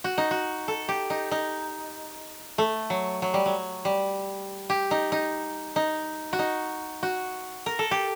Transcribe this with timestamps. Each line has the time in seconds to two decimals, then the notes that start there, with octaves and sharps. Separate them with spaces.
0.04 F#4
0.18 D#4
0.31 F#4
0.68 A4
0.89 G4
1.10 D#4
1.31 D#4
2.58 A3
2.90 F#3
3.22 F#3
3.34 G3
3.46 F#3
3.85 G3
4.70 G4
4.91 D#4
5.12 D#4
5.76 D#4
6.33 F#4
6.39 D#4
7.03 F#4
7.66 A#4
7.79 A4
7.91 G4